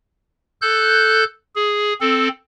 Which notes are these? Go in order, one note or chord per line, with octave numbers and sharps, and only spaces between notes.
A4 F#6 G6
G#4
C4 A4